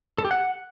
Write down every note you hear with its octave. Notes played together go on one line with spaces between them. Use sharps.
A4
G4
F#5